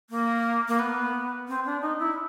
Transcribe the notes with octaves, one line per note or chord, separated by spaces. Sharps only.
A#3
A#3
B3
C4
D4
D#4
E4